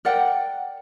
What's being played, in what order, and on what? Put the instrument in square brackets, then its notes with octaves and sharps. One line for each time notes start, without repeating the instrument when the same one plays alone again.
[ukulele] A#4 D5 F#5 G5